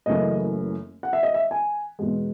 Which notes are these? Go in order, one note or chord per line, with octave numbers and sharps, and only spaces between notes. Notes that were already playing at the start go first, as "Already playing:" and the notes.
F#1 F#2 C#3 E3 A3 D#5
F#5
E5
D#5
E5
G#5
E2 B2 G#3